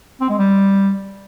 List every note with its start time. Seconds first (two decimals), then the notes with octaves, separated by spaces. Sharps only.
0.21 C4
0.29 G#3
0.38 G3